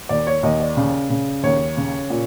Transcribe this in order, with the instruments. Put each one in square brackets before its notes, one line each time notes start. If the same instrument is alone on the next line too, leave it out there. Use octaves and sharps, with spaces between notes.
[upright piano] D#2 D5
C#5
D#2 D#5
D5
C#3
C#3
D#2 C#5
C#3
A#2